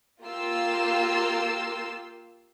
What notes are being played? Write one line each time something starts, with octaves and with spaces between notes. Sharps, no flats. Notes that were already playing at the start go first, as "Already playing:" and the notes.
A#3 F4 G4 F5 C6 E6